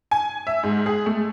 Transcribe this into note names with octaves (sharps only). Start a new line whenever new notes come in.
G#5
E5
G#2
G#4
A3